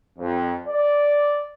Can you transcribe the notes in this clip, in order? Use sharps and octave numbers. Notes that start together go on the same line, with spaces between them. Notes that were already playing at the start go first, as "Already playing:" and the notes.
F2
D5